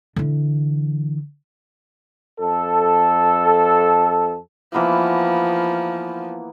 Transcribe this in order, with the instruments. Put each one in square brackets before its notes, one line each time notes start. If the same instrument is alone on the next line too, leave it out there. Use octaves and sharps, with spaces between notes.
[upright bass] D3 E3
[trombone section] F2 A4
[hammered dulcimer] E3 A#3 B3 [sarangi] F3